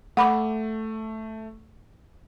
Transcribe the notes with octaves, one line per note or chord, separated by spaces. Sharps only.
A3 F#5 B5 D6